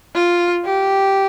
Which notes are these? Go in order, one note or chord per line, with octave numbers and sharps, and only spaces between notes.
F4
G4